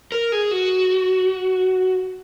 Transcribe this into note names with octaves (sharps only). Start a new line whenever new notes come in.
A#4
G#4
F#4